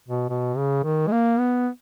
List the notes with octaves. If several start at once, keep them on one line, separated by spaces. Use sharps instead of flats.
B2
B2
C#3
D#3
G#3
A#3
B3